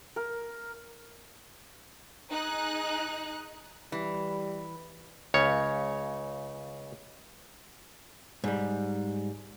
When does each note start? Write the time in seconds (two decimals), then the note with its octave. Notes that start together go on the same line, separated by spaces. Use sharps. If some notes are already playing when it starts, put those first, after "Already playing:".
0.16 A#4
2.30 D#4 G#4 F#6
3.92 E3 G3
5.34 C#2 C#3 C#5
8.44 G#2 G3